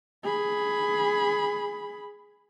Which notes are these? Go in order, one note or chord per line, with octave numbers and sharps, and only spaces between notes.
G#4 B5